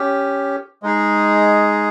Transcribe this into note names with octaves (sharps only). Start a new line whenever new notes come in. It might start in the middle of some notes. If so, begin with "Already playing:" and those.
Already playing: C#4 G4
G#3 D#4 G#4